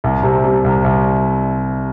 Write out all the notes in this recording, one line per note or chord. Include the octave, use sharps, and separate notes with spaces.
C2
C3
G3
C2
C2